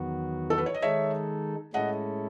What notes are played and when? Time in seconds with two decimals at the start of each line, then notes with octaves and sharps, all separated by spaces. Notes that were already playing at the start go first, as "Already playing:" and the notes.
Already playing: E2 D#3 F#3 B3 F#4
0.50 A4
0.58 B4
0.66 C#5
0.74 D#5
0.82 D#3 G#3 D#4 A4 C#5 E5
1.73 A2 G#3 C#4 E4 A4 D#5 F#5